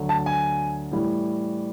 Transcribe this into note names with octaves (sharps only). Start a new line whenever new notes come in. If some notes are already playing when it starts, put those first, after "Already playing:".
Already playing: D2 D3 F#3
A5
G#5
A2 E3 G3